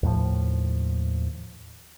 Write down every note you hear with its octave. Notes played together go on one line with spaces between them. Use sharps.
D#2 A2 F3